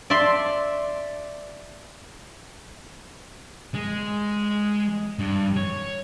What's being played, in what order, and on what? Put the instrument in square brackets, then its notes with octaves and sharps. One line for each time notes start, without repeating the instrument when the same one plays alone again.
[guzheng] D5 E5 A5 C6
[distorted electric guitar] G#3
G2
C#5